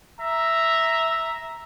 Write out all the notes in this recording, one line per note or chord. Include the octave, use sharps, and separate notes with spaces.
E5 A#5